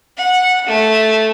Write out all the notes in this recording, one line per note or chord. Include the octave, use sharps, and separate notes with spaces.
F#5
A3